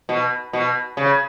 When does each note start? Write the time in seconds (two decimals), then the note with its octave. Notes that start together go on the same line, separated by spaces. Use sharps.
0.09 B2
0.53 B2
0.97 C#3